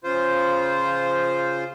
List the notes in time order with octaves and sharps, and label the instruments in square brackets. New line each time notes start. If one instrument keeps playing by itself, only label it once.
[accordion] C#3 F4 C5